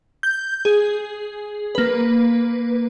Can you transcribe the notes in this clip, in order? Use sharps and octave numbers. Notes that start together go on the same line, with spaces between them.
G6
G#4
A#3 B4